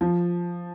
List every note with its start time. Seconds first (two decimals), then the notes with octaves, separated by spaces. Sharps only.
0.01 F3